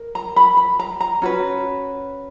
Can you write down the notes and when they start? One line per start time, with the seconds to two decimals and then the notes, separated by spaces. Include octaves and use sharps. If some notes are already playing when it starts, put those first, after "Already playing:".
Already playing: A#4
0.15 A#5
0.36 B5
0.57 B5
0.79 A#5
1.01 A#5
1.22 C#4 F#4 B4